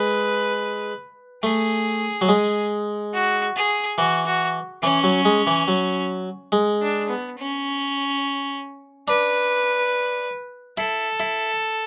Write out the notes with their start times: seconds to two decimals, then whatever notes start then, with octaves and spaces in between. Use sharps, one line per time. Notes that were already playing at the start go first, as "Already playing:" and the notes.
Already playing: G#3 B4
1.43 A3 G#4
2.21 F#3
2.29 G#3
3.13 F#4
3.56 G#4
3.98 E3 F#4
4.26 F#4
4.82 E3 C#4
5.04 F#3
5.25 G#3
5.47 E3
5.68 F#3
6.52 G#3
6.81 D4
7.09 B3
7.38 C#4
9.08 D4 B4
10.78 E4 A4
11.20 E4